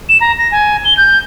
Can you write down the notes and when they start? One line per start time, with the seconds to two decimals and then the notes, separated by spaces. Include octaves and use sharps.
0.09 E7
0.21 A#5
0.38 A#6
0.51 G#5
0.85 G7
0.97 G6